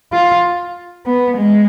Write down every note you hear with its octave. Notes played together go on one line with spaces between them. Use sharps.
F4
B3
G#3